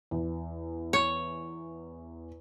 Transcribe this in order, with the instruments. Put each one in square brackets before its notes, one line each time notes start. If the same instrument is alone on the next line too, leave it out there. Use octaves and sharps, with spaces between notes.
[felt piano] E2
[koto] C#5